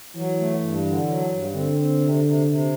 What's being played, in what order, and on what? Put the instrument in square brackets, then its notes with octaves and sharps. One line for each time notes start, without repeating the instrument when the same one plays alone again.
[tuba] E3 [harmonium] F#3
[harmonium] A3
G2
D3
F#3
G2
[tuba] D3 [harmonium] C4
[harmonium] C4
C3
C3
C3